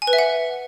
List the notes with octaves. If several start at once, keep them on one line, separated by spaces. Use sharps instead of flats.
G#5
B4
E5
F#5